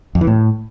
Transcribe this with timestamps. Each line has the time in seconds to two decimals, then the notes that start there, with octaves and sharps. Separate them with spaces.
0.15 F2
0.21 E3
0.27 A2